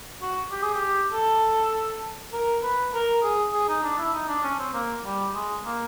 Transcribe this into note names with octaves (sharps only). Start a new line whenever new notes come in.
F#4
G4
G#4
G4
A4
A#4
B4
A#4
G#4
G#4
D#4
D4
E4
D#4
D4
C#4
C4
A#3
G3
G#3
A#3